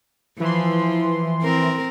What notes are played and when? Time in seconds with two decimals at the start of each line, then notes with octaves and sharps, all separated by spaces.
0.40 E3 F3 C6
1.43 C4 A#4